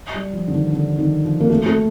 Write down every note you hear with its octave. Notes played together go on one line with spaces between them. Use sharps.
G3
F3
D3
D#3
D3
D#3
F3
A#3
A3
A3